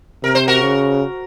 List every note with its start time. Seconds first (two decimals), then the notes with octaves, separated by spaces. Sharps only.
0.23 C3 A#4
0.35 C5
0.48 F#4 A#4
0.62 C#3